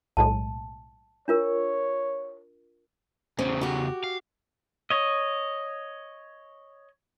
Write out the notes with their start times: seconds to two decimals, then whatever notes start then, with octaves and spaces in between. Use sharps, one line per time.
0.17 B1 A2 G#3 A5
1.28 D4 F4 A#4 C#5
3.39 E2 C#3 C4
3.61 F#4 G4
4.04 F5
4.90 C#5 D#5